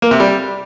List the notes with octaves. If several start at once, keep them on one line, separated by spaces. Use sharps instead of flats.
A#3
C3
G3